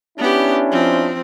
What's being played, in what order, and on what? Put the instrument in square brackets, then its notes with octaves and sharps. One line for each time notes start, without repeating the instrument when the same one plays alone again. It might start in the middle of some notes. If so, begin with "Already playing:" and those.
[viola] B3 G4 [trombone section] C#4 D4 E4
[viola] F3 C4